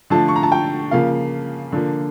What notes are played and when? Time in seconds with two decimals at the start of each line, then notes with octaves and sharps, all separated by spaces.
0.10 D3 F3 A3 A5
0.28 C#6
0.36 A#5
0.43 A5
0.52 G5
0.91 C#3 F3 A#3 F5
1.72 D3 F3 A#3